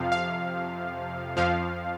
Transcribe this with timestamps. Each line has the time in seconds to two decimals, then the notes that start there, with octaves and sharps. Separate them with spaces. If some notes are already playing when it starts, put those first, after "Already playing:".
Already playing: F2 C3 F3 F5
0.12 F5
1.37 F2 F3 F5